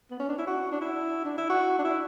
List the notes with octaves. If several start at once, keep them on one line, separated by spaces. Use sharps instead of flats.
B3
C#4
D4
E4
F#4
D4
E4
D4
E4
F#4
D4
E4